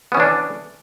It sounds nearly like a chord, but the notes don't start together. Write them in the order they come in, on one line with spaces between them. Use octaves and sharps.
B3 C#4 E3 D4